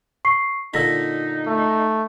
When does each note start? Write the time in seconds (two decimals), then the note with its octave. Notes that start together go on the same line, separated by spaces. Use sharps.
0.25 C#6 C7
0.74 A#2 D3 D#4 E6 A#6 B6
1.47 A3